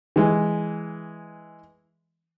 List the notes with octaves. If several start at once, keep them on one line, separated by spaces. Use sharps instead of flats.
E3 G#3